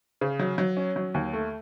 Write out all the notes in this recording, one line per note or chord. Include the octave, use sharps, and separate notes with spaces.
C#3
F#3
F#3
C#4
F#3
D#2
A3